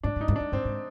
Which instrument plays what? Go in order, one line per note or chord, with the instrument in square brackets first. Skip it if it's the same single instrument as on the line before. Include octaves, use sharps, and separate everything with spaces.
[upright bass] G#2 [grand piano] D4
[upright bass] G#2
[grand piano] D#4
[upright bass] G2
[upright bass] F2 [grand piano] D4
[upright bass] G2 [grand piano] C4
[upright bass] G#2